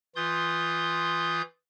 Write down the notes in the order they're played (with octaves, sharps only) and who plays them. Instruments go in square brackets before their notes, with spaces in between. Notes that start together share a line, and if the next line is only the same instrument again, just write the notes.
[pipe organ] E3 F4 C6 D#6 G6